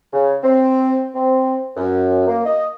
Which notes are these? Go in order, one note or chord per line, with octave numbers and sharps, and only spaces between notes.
C#3
C4
C4
F#2
A#3
D#5